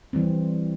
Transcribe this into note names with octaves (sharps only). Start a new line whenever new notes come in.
E3 G3 C4